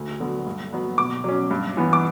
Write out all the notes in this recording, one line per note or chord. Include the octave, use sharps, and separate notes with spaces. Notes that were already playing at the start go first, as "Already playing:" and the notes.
Already playing: D2
D3 F#3 B3
G2
F#3 B3
B2 D6
F#3 C#4
G2
E3 B3
D6